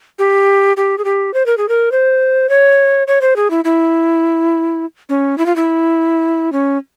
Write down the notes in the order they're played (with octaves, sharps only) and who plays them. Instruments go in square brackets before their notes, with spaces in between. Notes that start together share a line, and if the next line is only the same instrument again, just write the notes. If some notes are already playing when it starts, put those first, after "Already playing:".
[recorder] G4
G4
G#4
G4
C5
A#4
G#4
A#4
C5
C#5
C#5
C5
G#4
E4
E4
C#4
E4
F4
E4
C#4